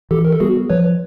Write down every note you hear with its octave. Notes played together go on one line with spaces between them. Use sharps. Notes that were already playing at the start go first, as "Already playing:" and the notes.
E3 G4 A4
A#4
A4
G3 B3 F#4 G#4
F3 B4 C#5